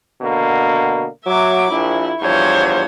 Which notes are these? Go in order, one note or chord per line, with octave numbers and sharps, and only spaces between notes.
B2 D3 A#3
F#3 E5 D6
A#1 E4
E2 G2 F3 C5 C#5